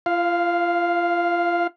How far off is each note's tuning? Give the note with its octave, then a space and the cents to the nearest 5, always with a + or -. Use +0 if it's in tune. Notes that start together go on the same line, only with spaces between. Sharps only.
F4 -35 F5 +0